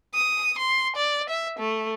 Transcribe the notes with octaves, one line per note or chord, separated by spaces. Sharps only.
D#6
C6
D5
E5
A3